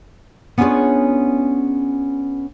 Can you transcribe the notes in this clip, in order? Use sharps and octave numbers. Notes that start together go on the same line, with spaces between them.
B3 C#4 D4 F4 G#4 C#5